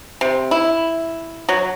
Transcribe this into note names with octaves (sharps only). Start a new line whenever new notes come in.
C3
E4
F#3